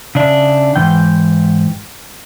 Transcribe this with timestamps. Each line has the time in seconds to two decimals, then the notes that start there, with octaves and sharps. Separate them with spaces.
0.15 C#3 D4 E5
0.76 G#2 E3 G5